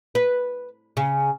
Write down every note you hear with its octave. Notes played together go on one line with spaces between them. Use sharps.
B4
C#3